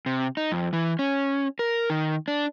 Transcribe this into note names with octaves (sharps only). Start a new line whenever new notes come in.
C3
D#4
F2
E3
C#4
A#4
D#3
D4